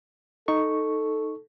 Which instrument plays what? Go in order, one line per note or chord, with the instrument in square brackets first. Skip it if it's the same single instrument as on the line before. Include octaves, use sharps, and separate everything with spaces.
[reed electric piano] D#4 C#6 [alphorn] A4